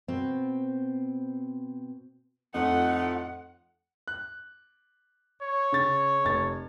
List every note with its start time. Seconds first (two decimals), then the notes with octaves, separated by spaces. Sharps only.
0.08 B2 C4
2.54 F2 A2 F3 A3 D#4 F#5
4.08 F#6
5.42 C#5
5.72 C#3 A6
6.25 F1 A6